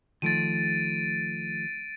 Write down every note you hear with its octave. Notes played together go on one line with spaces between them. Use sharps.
D#3 F3 A3 A6 D7 D#7